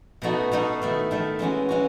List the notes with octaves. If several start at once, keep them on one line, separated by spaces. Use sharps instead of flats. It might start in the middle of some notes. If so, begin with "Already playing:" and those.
B2 A3 D#4 F#4
B2 A3 D#4 F#4
D#3 A3 E4
D#3 A3 E4
E3 G#3 C#4 F#4
E3 G#3 C#4 F#4